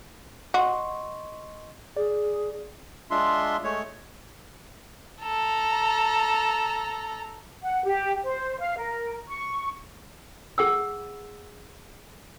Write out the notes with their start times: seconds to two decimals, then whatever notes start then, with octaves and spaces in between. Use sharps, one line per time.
0.54 F#4 D#5 C6 C#6
1.97 G#4 D5
3.11 G#3 D4 F4 E5 C6
3.64 G#3 A3 C#5
5.23 A4 A#5
7.63 F#5
7.85 G4
8.23 C5
8.59 F5
8.78 A#4
9.29 C#6
10.58 G#4 F#5 E6